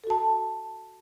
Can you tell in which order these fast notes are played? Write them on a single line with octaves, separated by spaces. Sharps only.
A4 F#4 A5